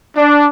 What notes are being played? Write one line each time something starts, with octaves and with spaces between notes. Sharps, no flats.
D4